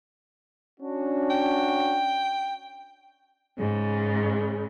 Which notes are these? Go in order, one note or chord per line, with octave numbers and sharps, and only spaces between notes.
C#4 D4 F#4
G5
G#2 C#3